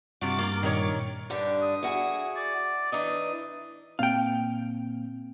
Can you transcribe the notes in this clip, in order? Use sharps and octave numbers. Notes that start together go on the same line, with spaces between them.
G2 C3 F3 F#4 D6 A6
A#3 A#4
A#2 D#3 A#3 A#4 C#5
G2 D3 D4 G4
D#6
E4 F#4 G#4
D5
E3 D4 D#4 D#6
A#2 A#3 C4 F5 G5